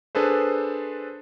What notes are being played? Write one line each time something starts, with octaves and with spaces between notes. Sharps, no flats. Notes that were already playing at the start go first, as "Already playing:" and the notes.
D4 G#4 A4 B4 C5